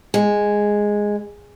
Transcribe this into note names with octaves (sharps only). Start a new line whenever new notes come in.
G#3